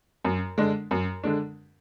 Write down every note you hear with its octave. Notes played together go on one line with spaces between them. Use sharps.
F#2
D3 G#3 D4
F#2
D3 G#3 D4